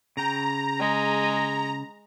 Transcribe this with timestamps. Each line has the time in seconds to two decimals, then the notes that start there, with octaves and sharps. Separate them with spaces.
0.17 C#3 G5 A#5
0.80 G#3